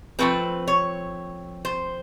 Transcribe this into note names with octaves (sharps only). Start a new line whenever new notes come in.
F3 A3 C4 B4
C#5
C5